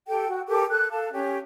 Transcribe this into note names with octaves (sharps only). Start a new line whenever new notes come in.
G4 A4 G5
F#4
G4 A4 A#4 D6
A4 F#6
A4 F5 A5
C#4 G4 C#5